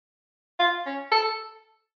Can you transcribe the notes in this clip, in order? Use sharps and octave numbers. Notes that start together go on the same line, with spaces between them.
F4
C#4
A4